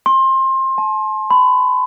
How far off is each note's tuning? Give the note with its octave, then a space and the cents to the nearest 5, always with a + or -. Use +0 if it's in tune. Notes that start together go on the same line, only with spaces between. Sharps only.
C6 +25
A5 -40
B5 +30